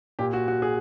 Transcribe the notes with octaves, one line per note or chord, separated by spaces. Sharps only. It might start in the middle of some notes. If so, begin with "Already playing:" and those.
A#2 G4
F#4
F#4
G#4